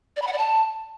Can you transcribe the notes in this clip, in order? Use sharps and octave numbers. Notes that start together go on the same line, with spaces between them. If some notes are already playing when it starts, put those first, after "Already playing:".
D5
B5
F#5
D5
A5